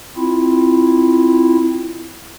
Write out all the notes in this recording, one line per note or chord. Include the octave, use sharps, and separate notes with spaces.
C4 E4 F4